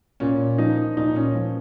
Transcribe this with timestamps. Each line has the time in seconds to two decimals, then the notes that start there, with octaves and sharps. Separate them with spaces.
0.20 A#2 C#4
0.58 F3 D#4
0.97 A#2 D#4
1.16 C#4
1.35 F3